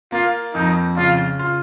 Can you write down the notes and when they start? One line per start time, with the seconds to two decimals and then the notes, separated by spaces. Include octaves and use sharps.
0.12 A#3 F4
0.55 F2 D#4
0.97 C#3 F4
1.39 F4